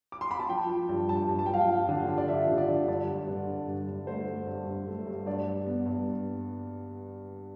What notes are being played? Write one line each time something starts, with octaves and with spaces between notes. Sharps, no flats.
D6
C6
B5
A5
F3 G5
F3
G2
G2 A5
G2
A5
G5
F3 F5
G5
F3
D3
D3
D5
F3 E5
D3
D5
D3
G2 D5
G2
D3
G2
G2
G2
A3 C5
A3
G2
G2
A3
G2
G2 D5
G2
B3
G2